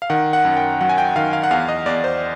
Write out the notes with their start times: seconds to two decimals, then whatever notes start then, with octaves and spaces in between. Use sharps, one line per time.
0.02 F5
0.10 D#3 F#5
0.33 F#5
0.45 F#2
0.57 G5
0.81 F#3 F#5
0.89 G#5
0.98 G5
1.16 D#3 F5
1.33 F5
1.44 F#5
1.51 E2 F5
1.69 D#5
1.86 E2 D5
2.04 C5